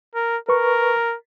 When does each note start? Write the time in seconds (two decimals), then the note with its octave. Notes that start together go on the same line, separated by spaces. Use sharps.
0.15 A#4
0.49 A#4 B4 C#6